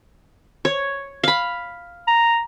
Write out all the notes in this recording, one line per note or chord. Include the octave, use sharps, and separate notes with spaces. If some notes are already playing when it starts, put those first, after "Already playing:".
C#5
F5 B5
A#5